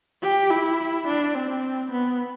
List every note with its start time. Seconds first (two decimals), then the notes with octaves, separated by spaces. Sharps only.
0.22 G4
0.50 E4
1.07 D4
1.35 C4
1.91 B3